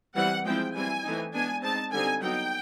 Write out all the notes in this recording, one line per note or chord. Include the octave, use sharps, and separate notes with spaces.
E3 G3 C4 F#5
F3 G#3 C4 E4 G5
E3 G3 C4 E4 G#5
E3 A3 C4 D#4
G#3 B3 D4 G#5
G#3 C4 D#4 A5
D3 G3 C4 D#4 G#5
F#3 B3 D#4 G5